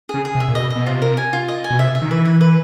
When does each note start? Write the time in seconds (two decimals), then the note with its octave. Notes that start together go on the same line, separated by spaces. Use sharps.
0.09 C#3 G#4
0.25 G#4
0.35 C3
0.40 E5
0.48 A#2
0.55 B2 D#5
0.70 D#5
0.76 B2
0.86 C3 F4
1.02 A#4
1.17 G#5
1.33 F4
1.48 D#5
1.64 G#5
1.70 B2
1.79 C3 E5
1.95 E5
2.02 D#3
2.10 E3 B4
2.25 B4
2.41 B4